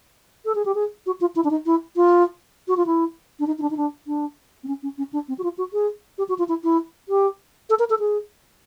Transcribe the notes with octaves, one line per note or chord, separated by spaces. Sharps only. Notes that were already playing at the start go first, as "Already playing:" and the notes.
A4
G#4
G4
G#4
F#4
F4
E4
D4
D#4
E4
F4
F#4
F4
E4
D4
D#4
D#4
D4
D#4
D4
D4
C4
C#4
C#4
C#4
D4
C4
F#4
F4
F#4
G#4
G4
F#4
F4
E4
E4
G4
A4
A#4
A4
G#4